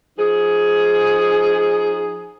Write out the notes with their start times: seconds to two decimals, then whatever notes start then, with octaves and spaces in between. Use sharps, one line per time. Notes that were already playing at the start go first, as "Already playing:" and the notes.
0.18 F3 D#4 G#4